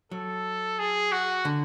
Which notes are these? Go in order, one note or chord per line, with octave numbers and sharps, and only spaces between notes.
F#3 A4
G#4
F#4
D3